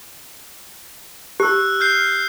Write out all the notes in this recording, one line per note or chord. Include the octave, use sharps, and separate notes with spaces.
G4 E6 F#6
F6 G6 C7